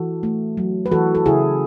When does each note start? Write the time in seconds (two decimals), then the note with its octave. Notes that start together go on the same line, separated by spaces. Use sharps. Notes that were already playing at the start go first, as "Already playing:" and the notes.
Already playing: E3 F#4 A4
0.23 A3
0.57 F#3
0.86 B4
0.91 E3 F#4 A4
1.15 A4
1.26 C#3 E4 G#4